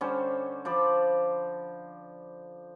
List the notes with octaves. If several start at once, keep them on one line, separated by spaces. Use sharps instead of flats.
D3 G3 C#4 C5
F3 C5 D5 B5